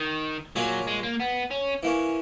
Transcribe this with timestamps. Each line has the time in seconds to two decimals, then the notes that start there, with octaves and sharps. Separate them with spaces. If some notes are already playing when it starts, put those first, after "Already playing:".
Already playing: D#3
0.56 A#2 F#3 A#3 C#4 G#4
0.87 G#3
1.03 A#3
1.20 B3
1.51 C#4
1.83 E3 A#3 C#4